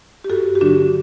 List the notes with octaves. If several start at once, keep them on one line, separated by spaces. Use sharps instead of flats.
G4
G2 F#4 A4
G4
D3 F#3 D4 F#4